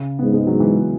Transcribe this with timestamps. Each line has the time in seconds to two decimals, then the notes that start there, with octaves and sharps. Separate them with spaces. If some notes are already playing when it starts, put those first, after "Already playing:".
Already playing: C#3
0.19 G#2 B3
0.33 G#3
0.47 F#3
0.60 E3